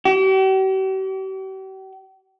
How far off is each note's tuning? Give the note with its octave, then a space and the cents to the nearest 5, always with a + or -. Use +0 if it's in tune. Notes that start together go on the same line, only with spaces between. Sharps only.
G4 -45